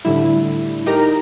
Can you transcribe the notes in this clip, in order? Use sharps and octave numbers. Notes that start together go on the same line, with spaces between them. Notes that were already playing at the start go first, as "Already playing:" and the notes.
A2 D3 G3 E4
D#4 G4 A#4 A#5